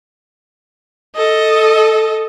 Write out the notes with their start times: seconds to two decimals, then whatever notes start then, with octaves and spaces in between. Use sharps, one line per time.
1.16 A4 D#5